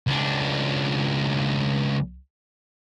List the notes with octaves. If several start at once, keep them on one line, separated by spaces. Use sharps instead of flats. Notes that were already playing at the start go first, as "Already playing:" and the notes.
C#2 D4